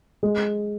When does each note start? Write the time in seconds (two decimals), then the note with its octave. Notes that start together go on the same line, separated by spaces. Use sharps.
0.23 G#3